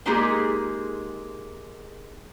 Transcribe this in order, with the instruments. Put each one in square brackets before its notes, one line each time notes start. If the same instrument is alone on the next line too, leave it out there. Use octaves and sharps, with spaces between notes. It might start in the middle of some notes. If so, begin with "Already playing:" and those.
[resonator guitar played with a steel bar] G#3 A#3 D#4 F4 G4 G#4